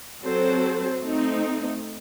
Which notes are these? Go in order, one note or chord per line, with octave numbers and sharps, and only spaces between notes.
F#3 C4 F#4 A4 C5
A3 C4 D#4